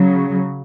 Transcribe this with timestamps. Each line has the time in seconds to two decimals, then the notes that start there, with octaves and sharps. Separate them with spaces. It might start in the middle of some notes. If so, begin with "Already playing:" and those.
Already playing: C#3 F#3